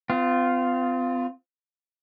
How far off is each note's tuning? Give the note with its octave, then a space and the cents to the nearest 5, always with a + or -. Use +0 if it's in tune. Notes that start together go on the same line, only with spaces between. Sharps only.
C4 -45 F4 -5